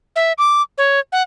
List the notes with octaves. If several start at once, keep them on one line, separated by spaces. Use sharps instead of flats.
E5
D6
C#5
F#5